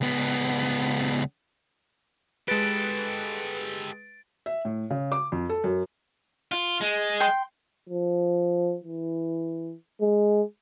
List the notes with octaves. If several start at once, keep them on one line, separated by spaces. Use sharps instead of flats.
C#2 B3
G#3 G4 A4 B4 A6 D7
E5
A2
C#3
D6
F2
A4
F#2
F4
G#3
G5 C6
F3
E3
G#3